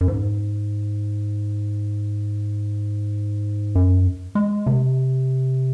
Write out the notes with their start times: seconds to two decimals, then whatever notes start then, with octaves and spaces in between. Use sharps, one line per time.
0.01 F#2
0.08 G#2
3.75 F#2
4.35 G#3
4.66 C3